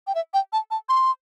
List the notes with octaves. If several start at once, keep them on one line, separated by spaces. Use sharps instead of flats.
G5
E5
G5
A5
A5
C6